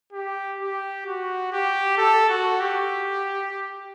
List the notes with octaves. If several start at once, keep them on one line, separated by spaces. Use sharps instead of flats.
G4
G4
F#4
G4
A4
F#4
G4